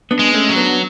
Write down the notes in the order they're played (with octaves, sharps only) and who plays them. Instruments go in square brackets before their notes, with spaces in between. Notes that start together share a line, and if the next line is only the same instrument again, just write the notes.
[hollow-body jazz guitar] B3 D4
[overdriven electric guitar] G#3
[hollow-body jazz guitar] A3 C#4
[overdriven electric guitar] F#3
[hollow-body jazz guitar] B3 D4